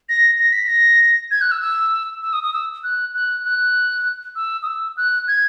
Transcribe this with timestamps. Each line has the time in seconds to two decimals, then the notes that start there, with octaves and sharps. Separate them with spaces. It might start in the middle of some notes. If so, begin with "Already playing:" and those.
0.09 A#6
0.39 A#6
0.53 B6
0.67 A#6
1.31 G#6
1.41 F#6
1.52 E6
1.62 E6
2.23 E6
2.33 D#6
2.43 D#6
2.53 E6
2.84 F#6
3.14 F#6
3.45 F#6
4.36 E6
4.63 D#6
4.67 E6
4.97 F#6
5.28 G#6